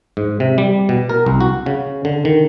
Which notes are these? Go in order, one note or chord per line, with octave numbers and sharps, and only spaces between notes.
G#2
C3
G3
B2
A#4
C2
F#4
C#3
D3
D#3